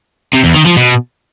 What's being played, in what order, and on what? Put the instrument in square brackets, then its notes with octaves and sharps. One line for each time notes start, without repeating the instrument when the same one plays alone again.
[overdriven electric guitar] C3
E2
D#3
F3
B2